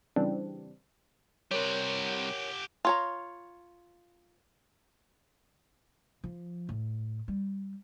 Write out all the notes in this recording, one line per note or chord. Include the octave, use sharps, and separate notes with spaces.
C#3 E3 G3 C4 D4
C3 G3 G4 A#4 C#5 F#5
F4 C#5 A#5
F3
A2
G3